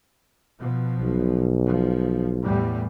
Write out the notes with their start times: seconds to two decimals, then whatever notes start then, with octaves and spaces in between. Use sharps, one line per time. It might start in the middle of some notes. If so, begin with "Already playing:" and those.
0.58 B2 F3
1.00 B1
1.67 F3
2.42 E2 A2 G3